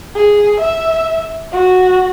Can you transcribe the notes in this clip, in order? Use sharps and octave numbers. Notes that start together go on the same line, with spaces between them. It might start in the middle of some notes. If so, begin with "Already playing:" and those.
G#4
E5
F#4